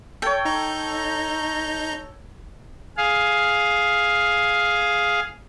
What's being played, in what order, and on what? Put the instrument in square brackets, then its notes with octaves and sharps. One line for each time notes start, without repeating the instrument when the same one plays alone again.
[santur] A4 C#5 [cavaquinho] G5
[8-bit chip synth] D#4 A#5 G6
[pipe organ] G#4 F5